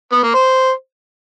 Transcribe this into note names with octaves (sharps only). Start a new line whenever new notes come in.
B3
A#3
C5